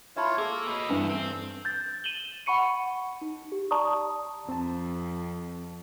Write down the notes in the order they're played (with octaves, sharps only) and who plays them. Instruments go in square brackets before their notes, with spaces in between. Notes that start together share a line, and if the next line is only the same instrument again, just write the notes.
[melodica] F4 C#5 [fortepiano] E5 A5 B5
[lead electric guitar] A#3 [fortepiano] G#4 [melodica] A4
[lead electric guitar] B4 D#5
[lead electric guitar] E2 [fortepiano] G2 E3 D4
[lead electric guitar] C4
[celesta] G6 A6
D#7 E7 F#7 G7
F#5 B5 C#6 C#7 D#7
D#4
G4
D5 A5 A#5 C#6 D#6
[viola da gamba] F2 [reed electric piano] C4 A5